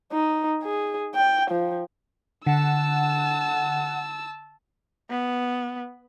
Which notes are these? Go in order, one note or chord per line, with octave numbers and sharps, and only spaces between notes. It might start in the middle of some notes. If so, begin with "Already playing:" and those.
D#4
G#4
G5
F3
D3 F#5 A5 E6
B3